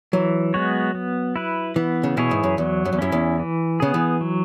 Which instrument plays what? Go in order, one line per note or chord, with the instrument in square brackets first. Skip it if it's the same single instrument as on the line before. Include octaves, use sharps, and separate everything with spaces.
[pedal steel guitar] E3 [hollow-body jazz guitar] F#3
[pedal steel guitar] G#3 B3 F#4 C#5
B3
E4 B4
[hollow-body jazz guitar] E3 [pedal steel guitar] B3
[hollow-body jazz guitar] C#3
[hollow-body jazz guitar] B2 [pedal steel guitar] E4 G#4 C#5
[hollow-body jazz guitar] G#2
F#2
[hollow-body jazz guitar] E2 [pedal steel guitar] F#3
[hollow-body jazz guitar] F#2
E2
[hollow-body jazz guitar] F#2 [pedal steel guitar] C#4 E4
[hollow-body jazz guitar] E2
[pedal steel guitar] E3
[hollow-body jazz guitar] C#3 [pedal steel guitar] B3 G#4
[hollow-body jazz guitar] E3
[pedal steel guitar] F#3